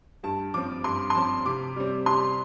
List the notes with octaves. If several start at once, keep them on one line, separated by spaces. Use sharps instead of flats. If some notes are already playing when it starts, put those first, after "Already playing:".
G2 A5
F3 C4 D6
G2 C6
C6
F3 C4 A5
C3 D6
G3 C4
C3 C6